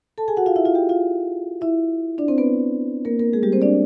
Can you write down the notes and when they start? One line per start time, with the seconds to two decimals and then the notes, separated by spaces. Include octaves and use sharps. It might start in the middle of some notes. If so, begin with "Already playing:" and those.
0.18 A4 A5
0.28 G#4 G#5
0.37 F#4 F#5
0.46 F4 F5
0.56 E4 E5
0.65 F4 F5
0.75 G4 G5
0.89 F4 F5
1.61 E4 E5
2.18 D4 D5
2.28 C4 C5
2.38 B3 B4
3.05 A#3 A#4
3.19 A#3 A#4
3.33 G#3 G#4
3.43 G3 G4
3.52 C4 C5
3.62 D4 D5